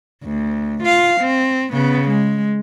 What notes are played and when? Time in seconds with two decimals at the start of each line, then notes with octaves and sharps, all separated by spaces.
0.24 D2
0.84 F4 F5
1.21 C4
1.72 C#3 B3
2.09 G#3